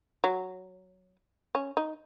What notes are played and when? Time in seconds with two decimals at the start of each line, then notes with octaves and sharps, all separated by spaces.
0.24 F#3
1.55 C#4
1.77 D#4